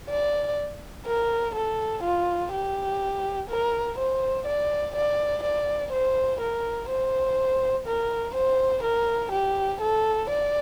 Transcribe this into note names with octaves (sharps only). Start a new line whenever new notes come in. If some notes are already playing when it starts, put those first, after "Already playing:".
D5
A#4
A4
F4
G4
A#4
C5
D5
D5
D5
C5
A#4
C5
A#4
C5
A#4
G4
A4
D5